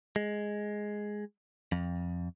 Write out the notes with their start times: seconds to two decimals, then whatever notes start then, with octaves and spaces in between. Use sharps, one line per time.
0.16 G#3
1.72 F2